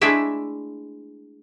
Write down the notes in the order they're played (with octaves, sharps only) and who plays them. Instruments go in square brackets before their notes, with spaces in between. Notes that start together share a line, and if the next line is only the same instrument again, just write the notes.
[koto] G#3 A3 D4 E4 E5